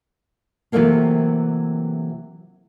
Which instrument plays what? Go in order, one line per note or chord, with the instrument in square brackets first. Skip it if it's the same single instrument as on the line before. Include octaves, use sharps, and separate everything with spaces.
[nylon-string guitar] C3 E3 F#3 A3 A#3 C4